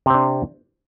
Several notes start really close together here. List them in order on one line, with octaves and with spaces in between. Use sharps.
C3 C4 D4